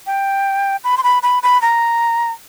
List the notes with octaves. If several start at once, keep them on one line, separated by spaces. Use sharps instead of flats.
G5
B5
C6
B5
B5
B5
A#5